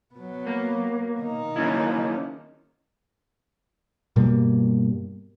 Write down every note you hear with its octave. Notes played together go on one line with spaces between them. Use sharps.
F#3 B3
A#3
D#3 D#4
A#3 C#4 E4
G2 B2 G3 A#3